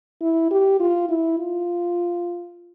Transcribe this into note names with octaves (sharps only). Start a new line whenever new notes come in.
E4
G4
F4
E4
F4